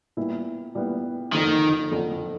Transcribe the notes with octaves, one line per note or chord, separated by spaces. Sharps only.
A#2 G3 B3 E4
A#2 G3 B3 E4
F#1 F2 D3 D#3 F3
F#1 F2 D3 F3